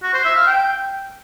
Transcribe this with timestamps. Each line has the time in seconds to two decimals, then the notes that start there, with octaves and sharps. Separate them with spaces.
0.03 F#4
0.14 C5
0.25 E5
0.36 F5
0.47 G5